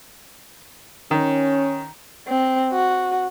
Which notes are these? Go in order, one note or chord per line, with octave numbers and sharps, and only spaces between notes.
D#3 C#4
C4
F#4